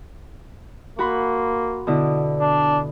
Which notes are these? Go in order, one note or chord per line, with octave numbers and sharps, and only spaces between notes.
A#3 F#4 B5 C6
B2 D3 E4
D4